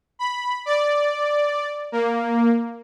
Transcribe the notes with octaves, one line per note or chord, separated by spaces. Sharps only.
B5
D5
A#3